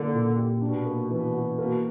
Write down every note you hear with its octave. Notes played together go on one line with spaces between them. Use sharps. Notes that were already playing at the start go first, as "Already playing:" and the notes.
Already playing: D3 A#3 E4
A#2
G4
B2 D4
A#3
B2 E3
F#4
B2 A#3